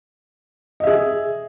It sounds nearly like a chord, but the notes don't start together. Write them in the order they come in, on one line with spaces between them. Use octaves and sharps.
D#5 E5 G#4